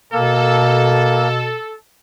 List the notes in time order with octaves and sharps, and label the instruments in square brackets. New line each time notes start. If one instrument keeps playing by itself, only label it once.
[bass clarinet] B2 [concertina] A#3 [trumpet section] A4